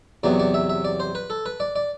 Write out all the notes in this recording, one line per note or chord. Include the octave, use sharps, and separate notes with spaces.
E2 C3 F#3 B3 D5
D5
E5
E5
D5
C5
B4
A4
B4
D5
D5